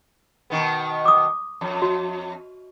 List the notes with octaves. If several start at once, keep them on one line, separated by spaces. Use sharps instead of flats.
B2 D#3 B3
D6 D#6
F2
F#4